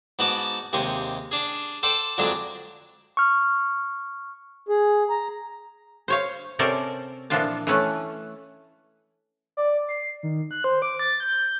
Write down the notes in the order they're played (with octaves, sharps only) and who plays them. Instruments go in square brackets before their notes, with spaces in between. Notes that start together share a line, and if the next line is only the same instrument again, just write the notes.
[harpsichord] G#2 B3 F#4 D5 A5
D#2 C3 G#3 D#5 C#6
D4 G#4
A4 C5 D5 F#5 G5
F2 D3 F#3 G#3 D4
[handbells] C#6 F6
[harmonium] G#4
A#5
[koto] C5 C#5 F5
C3 C#4 A4 A#4 C5 D5
A#2 E3 F3 D4 F4 A5
E3 A3 C#4 B4
[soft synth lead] D5
C7
D#3
F#6
C5
D6
A6
G6